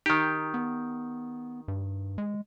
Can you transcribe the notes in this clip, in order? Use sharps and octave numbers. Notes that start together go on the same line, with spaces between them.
D#3 D#4 G4
B3
G2
G#3